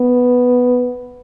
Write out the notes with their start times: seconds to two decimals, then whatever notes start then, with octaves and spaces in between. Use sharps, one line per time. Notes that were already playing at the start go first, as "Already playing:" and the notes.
Already playing: B3